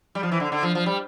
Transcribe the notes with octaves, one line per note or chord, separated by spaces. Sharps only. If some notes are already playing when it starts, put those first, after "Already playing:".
G3
F3
E3
D3
D3
F3
F3
G3